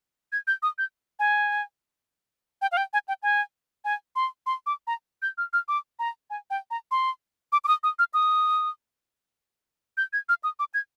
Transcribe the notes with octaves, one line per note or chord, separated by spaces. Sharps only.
G#6
G6
D#6
G6
G#5
G5
F5
G5
G#5
G5
G#5
G#5
C6
C6
D6
A#5
G6
F6
F6
D6
A#5
G#5
G5
A#5
C6
D6
D6
D#6
D#6
F6
D#6
G6
G#6
F6
D#6
D6
G#6